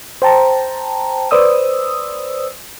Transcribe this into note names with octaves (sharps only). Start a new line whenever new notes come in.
C5 G5 A5 A#5
B4 C5 D5 D#6 E6